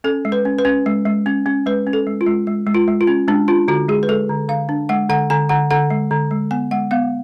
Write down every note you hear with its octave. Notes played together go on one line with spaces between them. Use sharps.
C#4 A4
G#3
B4
C#4
B4
C#4
G#3
G#3
C#4
C#4
G#3 B4
C#4
A4
G#3
F4
G#3
G#3
G#3
F4
G#3
F4
C#4
G#3 D4
D4 F4
D3 F#4
G#3 G#4
B4
G#3 A4
D3
D3 F5
D4
G#3 F#5
D3 F#5
D3 G#5
D3 F#5
D3 F#5
G#3
D3
G#3
B3 G#5
G#3 F#5
B3 F5